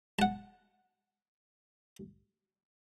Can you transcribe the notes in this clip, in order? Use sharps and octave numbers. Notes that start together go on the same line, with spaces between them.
F#5 A5